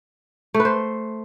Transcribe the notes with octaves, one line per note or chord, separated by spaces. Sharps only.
A3
B4
C5